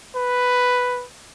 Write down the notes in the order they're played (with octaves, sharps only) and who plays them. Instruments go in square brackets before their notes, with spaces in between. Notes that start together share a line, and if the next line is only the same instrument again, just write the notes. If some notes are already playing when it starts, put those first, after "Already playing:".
[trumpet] B4